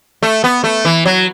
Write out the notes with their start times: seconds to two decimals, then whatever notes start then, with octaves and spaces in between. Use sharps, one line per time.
0.23 A3
0.44 B3
0.64 A3
0.85 E3
1.06 F#3